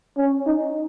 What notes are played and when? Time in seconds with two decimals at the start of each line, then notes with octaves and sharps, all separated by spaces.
0.17 C#4
0.46 D#4